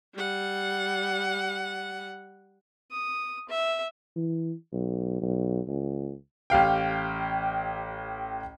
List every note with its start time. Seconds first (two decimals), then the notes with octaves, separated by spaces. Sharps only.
0.15 G3 F#5
2.91 D#6
3.49 E5
4.16 E3
4.73 B1
5.22 B1
5.68 C#2
6.50 A1 G4 F5 G5